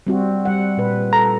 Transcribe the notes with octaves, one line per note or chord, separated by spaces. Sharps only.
G3 C4 F#4
G3 F#5
A#2 B4
A4 A#5